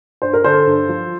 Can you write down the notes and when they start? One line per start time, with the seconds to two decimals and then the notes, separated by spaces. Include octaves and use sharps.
0.22 G2 C5
0.33 A#4
0.44 D3 A4 C5
0.66 G2
0.89 F3